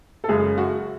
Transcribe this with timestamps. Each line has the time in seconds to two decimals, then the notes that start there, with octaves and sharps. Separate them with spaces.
0.24 A4
0.28 F#2 C#3 G#3 G#4
0.58 F#4